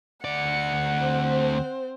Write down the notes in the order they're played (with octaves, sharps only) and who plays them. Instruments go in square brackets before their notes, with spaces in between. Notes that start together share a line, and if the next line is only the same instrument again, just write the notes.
[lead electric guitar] D2 D5 [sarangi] F#5 [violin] C#7
[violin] C4 C5